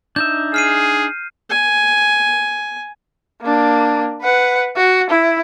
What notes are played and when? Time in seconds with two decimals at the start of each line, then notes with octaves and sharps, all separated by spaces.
0.16 D4 D#4 E5 G6
0.54 G#4 F6 C7 D#7
1.50 G#5
3.42 A#3 D4
4.22 B4 F#5
4.76 F#4
5.10 E4